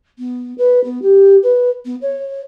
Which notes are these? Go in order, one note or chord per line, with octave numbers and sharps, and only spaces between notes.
B3
B4
B3
G4
B4
B3
C#5